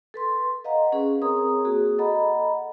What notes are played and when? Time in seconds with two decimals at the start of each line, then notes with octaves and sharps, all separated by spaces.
0.14 A4 B4 C6
0.64 B4 D#5 F5 F#5 A#5
0.92 C#4 G#4 B4
1.22 C4 G#4 A#4 C#5 A#5 D#6
1.65 A#3 F#4 G#4
1.99 A4 D#5 F#5 A#5 B5